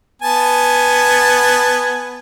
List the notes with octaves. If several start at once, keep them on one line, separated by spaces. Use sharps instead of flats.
B3 G#5 A5